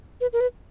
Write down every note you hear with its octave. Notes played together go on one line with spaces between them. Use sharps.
B4
A#4
B4